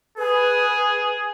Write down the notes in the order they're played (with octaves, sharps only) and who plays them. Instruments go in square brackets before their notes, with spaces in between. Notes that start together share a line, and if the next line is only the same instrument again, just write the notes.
[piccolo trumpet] G#4 [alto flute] B4